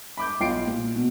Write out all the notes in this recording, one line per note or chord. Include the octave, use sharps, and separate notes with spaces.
B5 D6 G6
B1 F4 G5 C7 D7
A#2
B2